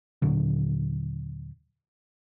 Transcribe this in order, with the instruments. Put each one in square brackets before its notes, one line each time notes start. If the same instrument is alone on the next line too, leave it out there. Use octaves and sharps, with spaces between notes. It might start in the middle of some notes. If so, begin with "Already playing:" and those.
[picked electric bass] D#2 A#2 D3 F#3